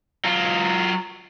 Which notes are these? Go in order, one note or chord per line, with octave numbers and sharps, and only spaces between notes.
F#3 F4